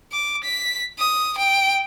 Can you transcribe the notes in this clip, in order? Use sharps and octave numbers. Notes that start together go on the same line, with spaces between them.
D6
B6
D#6
G5